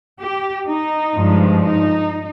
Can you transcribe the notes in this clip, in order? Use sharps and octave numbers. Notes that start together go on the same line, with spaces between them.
G4
D#4
G2 F3 G#3
D#4